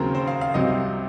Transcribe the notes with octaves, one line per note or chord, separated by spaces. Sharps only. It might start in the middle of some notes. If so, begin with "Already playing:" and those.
Already playing: D#2 C#3 F#3 C4 A#4
C5
F5
F5
C2 C3 F#3 C4 D#5